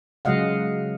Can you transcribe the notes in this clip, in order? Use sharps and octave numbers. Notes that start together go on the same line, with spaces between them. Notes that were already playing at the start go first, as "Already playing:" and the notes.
C#3 F#3 G#3 D#5 F5 F#5